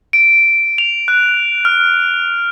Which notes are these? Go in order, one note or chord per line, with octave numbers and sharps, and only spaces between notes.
D7
F7
F#6
F6